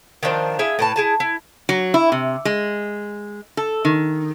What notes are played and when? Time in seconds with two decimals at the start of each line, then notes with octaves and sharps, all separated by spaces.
0.23 D#3 F3 D4 C5
0.59 E4 G#4 E5 F5
0.79 A2 B4 A5
0.96 E4 G#4 A5
1.20 E4
1.69 F#3
1.94 E4
2.12 C3
2.45 G#3
3.57 A4
3.85 D#3